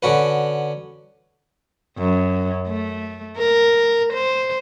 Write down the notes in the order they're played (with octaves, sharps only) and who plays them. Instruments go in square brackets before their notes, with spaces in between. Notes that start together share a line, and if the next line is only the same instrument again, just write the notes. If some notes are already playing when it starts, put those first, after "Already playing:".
[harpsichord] D3 C#4 F#4 B4
[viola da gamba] F#2
A3
A#4
C5